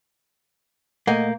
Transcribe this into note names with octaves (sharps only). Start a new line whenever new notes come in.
A#2 A3 A#3 D#5 F#5 G#5 G6